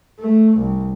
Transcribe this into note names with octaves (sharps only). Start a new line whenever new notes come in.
A3
C2